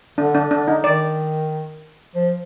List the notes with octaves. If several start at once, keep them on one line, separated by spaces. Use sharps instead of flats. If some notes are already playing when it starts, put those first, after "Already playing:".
D3 D4
D4
D3 D4
D#4
D#3 D5
F3